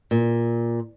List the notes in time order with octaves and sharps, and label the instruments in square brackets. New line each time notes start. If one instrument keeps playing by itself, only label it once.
[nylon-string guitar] A#2